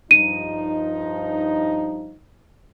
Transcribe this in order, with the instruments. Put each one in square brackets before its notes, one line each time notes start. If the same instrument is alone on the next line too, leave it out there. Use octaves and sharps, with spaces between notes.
[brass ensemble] G2 F3 D#4 [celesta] D#7